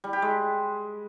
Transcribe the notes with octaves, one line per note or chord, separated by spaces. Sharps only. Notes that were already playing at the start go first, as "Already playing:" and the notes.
G3
G4
G#3